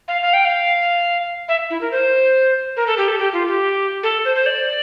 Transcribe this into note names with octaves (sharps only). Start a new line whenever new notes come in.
F5
F5
G5
F5
E5
E4
A#4
C5
A#4
A4
G4
A4
G4
F4
G4
A4
C5
C5
D5